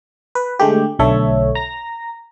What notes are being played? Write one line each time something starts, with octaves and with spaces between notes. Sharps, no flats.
B4
D3 G#3 A3 G4
B1 D3 A3 A4 C#5 E5
A#5 A#6